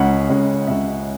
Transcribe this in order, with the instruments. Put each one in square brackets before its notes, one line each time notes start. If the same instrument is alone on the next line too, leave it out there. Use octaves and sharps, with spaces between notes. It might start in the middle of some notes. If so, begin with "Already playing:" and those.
Already playing: [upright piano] C#2 C#3 G#3 C#4 F#5
C#2 C#3 G#3 C#4
C#2 C#3 G#3 C#4 E5